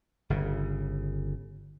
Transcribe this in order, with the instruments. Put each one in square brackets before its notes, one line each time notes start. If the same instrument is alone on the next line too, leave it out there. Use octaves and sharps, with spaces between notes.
[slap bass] G1 C#3